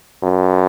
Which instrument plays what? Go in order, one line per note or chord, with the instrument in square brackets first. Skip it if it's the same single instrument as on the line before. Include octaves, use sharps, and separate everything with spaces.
[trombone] F#2